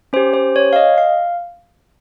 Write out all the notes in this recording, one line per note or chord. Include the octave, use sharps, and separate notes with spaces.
C#4 G4 C5
C5
C#5
F5
D#5
F5